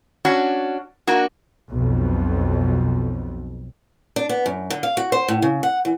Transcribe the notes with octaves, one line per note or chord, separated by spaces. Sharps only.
C#4 D4 F#4
A#3 D4 F#4
B1 F2
D4
B3
F#2
D3
F5
F#4
C5
A2
C#3
F#5
E3